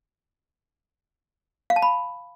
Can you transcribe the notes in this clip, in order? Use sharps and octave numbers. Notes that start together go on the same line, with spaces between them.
F5
A5
B5